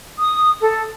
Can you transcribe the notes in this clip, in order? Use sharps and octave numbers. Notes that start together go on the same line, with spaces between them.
D#6
A4